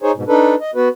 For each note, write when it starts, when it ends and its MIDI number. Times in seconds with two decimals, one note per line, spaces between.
0.02 0.12 63
0.02 0.12 68
0.02 0.12 72
0.02 0.12 73
0.15 0.23 44
0.15 0.23 47
0.28 0.55 62
0.28 0.55 63
0.28 0.55 69
0.28 0.55 71
0.60 0.71 75
0.75 0.88 59
0.75 0.88 66
0.75 0.88 71